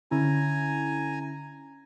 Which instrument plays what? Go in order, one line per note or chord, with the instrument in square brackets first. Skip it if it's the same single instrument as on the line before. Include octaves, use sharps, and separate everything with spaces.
[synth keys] D3 C#4 E4 [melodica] G#5 A#5